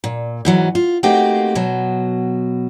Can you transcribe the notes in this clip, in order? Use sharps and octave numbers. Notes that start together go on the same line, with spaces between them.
A#2
G#2 E3 F#3
F4
A3 A#3 C4 D#4 F#4 G4
B2 F#3